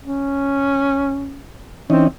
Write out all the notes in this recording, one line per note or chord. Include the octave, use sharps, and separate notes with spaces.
C#4
E3 C4 C#4 D#4